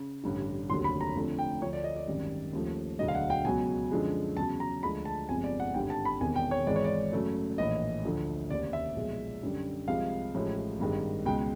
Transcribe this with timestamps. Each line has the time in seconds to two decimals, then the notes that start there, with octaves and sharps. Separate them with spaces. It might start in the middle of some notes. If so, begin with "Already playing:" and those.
Already playing: C#3
0.24 A1 G2 D3
0.70 F1 D#2 D3 F#3 C6
0.84 B5
1.01 A#5
1.15 F2 D3 F3 A3
1.38 G5
1.61 D2 D3 F3 A3 C#5
1.73 D5
1.84 D#5
1.96 D5
2.07 G#1 F#2 D#3 G3
2.53 D#2 C#3 F3 A3
2.99 E1 D2 D3 F#3 D#5
3.08 F5
3.15 F#5
3.30 G5
3.45 C#2 B2 F#3 G#5
3.91 F#2 D3 F3 G#3
4.37 E2 C#3 F#3 A5
4.60 A#5
4.83 D2 D3 F3 G#3 B5
5.05 A5
5.29 G1 F2 C3 F3 G#3 G#5
5.44 D5
5.60 F#5
5.74 G#1 G2 D3 G3 G5
5.90 A5
6.05 B5
6.20 E1 E2 C3 D#3 G#5
6.36 G5
6.51 C#5
6.67 G#1 G#2 E3 G#3 D5
6.76 C#5
6.84 D5
7.12 F#2 C#3 F#3 A3
7.58 A#1 A2 E3 D#5
8.04 D2 D3 F3 A3
8.50 F1 D#2 C#3 D5
8.73 E5
8.96 B1 A#2 F3 G#3
9.43 F#2 D3 G3
9.88 C2 C3 F3 G#3 F5
10.35 A1 A2 F3 G#3
10.79 G#1 G2 D#3 G#3
11.25 C#2 B2 G#3 G5